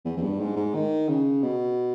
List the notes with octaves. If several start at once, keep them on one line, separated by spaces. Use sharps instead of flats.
E2
E2
G2
G#2
G#2
D#3
C#3
B2